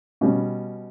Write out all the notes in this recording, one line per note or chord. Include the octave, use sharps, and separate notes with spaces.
B2 G3 C#4